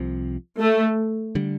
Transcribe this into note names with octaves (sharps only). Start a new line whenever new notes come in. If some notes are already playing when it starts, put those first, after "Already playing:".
Already playing: C2 C3 F3
A3
D3 G3